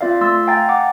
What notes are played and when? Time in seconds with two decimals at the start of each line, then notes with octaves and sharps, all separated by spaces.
0.01 C4 F4 D5 E5 F5
0.21 A3 C6 E6 A6
0.47 F5 G5 G#5 A#5 A6
0.69 F#5 D6